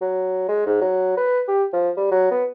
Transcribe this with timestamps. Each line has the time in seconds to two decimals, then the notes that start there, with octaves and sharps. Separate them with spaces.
0.01 F#3
0.49 G#3
0.66 G#2
0.81 F#3
1.17 B4
1.48 G4
1.73 F3
1.97 G3
2.11 F#3
2.31 B3